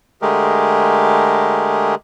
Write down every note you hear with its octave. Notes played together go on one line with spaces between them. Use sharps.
D3 G#3 A3 G4 G#4 A#4